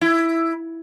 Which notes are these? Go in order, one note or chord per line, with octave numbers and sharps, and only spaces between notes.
E4